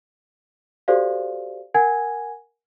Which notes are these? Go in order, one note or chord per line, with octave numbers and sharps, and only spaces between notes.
F#4 G4 A4 C5 D5 F5
A#4 F#5 G#5 G#6